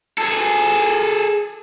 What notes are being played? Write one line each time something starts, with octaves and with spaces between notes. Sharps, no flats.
G#4 A4